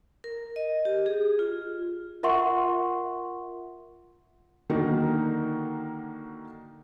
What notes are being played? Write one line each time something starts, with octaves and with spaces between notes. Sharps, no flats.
A#4
D#5
G4
G#4
F4
F4 A#4 E5 F#5 C6 C#6
D3 D#3 A#3 D#4 F#4 A#4